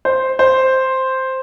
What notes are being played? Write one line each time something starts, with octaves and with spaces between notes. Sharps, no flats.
C5
C5